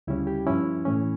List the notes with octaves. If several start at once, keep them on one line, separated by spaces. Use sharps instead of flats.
D2 C#3 G3 C#4 E4
G4
G2 F3 C#4 E4
A2 E3 A3 C#4